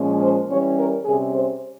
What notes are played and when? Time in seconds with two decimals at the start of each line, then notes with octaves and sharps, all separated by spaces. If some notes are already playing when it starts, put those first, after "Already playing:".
Already playing: A#2 F3 G#3 C#4
0.21 C5
0.49 E3 G3 C#4 C#5
0.77 A#4
1.05 C3 G3 C#4 G#4
1.33 C5